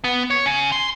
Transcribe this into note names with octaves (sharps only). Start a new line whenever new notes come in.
B3
C#5
C#3
C6